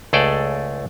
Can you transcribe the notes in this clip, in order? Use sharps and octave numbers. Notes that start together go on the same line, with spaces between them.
C#2 A3 G#4 A4 D5 G5